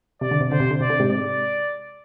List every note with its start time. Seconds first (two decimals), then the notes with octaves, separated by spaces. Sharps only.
0.21 C3 D5
0.31 D3
0.41 C3
0.51 D3 C5
0.60 C3
0.71 D3
0.80 C3 D5
0.90 D3
0.99 G#2 C3
1.10 D5